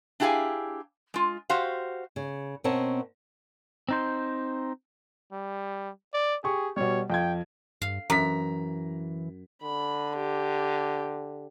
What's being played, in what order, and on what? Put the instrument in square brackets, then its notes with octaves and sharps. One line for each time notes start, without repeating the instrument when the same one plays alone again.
[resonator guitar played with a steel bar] D4 E4 G4 G#4 F5 G#5
G#3 F4
F#4 G4 C5 F5
[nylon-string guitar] C#3
B2 C4 C#4 A#4 F#5 A5
[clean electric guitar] C4 D#4 C5
[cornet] G3
D5
[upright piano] G4 C#6 [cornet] G#4
[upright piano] B2 G3 [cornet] C#5
[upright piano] F2 F5 G#6 [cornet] G5
[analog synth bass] G2 [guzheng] F5
[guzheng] F#2 [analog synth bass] E3 [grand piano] A#5 B6
[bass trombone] D3 [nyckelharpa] B5
[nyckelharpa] G4